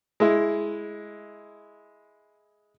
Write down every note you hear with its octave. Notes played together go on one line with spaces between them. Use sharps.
G#3 E4